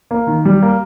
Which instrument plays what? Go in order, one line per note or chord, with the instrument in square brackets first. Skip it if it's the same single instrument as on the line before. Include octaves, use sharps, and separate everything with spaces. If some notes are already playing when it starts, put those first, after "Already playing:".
[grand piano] A#3
D#3
G3
A#3